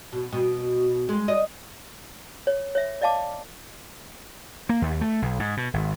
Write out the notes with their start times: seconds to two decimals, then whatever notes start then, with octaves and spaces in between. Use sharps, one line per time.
0.13 B2
0.33 B2
1.09 G#3
1.28 D#5
2.47 C#5
2.75 C#5 E5
3.01 D5 D#5 F5 A5 D6
4.69 A#3
4.82 D#2
5.01 A3
5.22 B1
5.39 G#2
5.57 B2
5.74 G#1